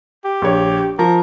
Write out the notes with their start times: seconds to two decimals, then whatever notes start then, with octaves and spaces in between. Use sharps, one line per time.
0.25 G4
0.42 A#1 C#5
0.99 F3 A#4